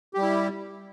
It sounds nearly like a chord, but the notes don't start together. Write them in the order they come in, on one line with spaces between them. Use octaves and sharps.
G4 G3 E4